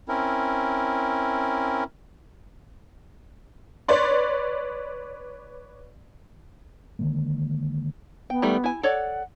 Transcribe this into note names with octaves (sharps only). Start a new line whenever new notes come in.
C4 C#4 E4 A#4
B4 C#5 D5 C6
D3 D#3 G#3 A#3
B3 G5
D#3 G3 A3
E4 G#5
A4 C#5 D5 F#5